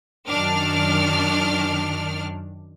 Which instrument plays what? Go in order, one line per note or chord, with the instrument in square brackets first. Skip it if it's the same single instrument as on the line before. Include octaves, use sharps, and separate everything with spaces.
[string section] F#2 D#3 D4 F6